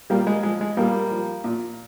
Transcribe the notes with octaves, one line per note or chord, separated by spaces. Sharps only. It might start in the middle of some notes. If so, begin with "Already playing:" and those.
A#2 G3 A#3
G#3
F3 G#3
G#3
A#2 G3 A#3
F3
A#2